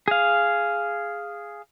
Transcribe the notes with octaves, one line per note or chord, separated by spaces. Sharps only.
G#4 F5